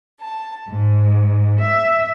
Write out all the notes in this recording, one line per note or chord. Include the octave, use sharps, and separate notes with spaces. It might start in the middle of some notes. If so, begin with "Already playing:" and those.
A5
G#2
E5